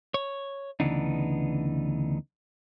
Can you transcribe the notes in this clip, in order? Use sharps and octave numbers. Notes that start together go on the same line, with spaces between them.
C#5
D2 C#3 E3 B3 D4 D#4